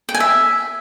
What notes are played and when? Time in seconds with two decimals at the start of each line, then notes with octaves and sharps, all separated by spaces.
0.09 G5
0.14 G#5
0.20 E5